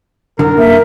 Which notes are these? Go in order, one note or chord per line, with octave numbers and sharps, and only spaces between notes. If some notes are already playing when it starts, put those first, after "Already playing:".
C2 F#2 D3 A#4
A#3 E5